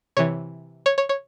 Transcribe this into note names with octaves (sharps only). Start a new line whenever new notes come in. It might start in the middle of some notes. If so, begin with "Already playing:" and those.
C3 E3 C#5
C#5
C#5
C#5